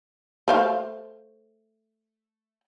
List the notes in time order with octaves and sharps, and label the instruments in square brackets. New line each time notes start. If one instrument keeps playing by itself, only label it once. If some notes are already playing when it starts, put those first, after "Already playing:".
[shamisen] A3 C5 F5